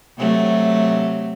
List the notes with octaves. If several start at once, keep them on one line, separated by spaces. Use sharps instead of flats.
C3 F#3 A3